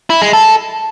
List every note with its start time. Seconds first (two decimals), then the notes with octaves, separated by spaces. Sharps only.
0.10 E4
0.22 G#3
0.33 A4